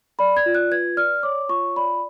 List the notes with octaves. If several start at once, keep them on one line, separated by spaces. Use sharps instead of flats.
D5 B5
G#6
F4
F#6
B4 G#6
D5 F6
C#5 D6
F4 C#6
D5 B5